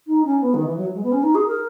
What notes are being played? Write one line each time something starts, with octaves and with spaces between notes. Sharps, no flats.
D#4
C#4
B3
D#3
E3
F#3
G#3
B3
C#4
D#4
G#4
A#4